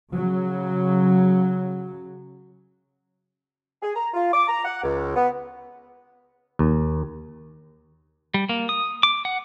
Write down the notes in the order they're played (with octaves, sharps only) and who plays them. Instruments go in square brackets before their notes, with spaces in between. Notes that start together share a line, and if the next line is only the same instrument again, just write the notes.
[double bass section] C#3 F#3
[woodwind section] G#4
A#5
F4
D6
A#5
F#5
C#2
B3
[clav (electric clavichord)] D#2
[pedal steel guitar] G3
A#3
D#6
D6
F#5